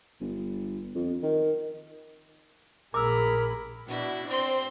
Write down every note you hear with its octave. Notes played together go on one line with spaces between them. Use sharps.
G1
F2
D#3
A#1 G#4 A#4 B5 D6 E6
B2 D4 E4 F#4
C4 C5 C6